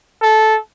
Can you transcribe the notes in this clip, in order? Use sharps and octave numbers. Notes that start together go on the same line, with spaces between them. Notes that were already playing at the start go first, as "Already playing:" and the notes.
A4